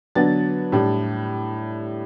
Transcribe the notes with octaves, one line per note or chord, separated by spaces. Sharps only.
D3 F#3 B3 D4 A6
A2 G3 D4